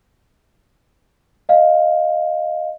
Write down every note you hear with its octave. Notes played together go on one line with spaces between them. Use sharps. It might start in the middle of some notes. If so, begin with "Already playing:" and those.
D#5 F5